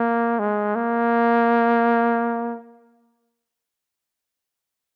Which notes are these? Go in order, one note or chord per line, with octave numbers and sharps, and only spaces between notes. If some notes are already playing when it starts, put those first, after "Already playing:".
Already playing: A#3
G#3
A#3